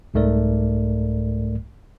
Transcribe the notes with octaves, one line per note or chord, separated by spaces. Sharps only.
C2 G#2 A3 A#4 D5